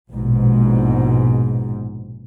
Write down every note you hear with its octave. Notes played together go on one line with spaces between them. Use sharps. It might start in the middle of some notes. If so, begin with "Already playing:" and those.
A#1 G#2 B2